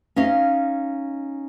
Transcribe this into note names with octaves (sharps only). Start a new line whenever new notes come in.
C#4 D#4 D#5 F5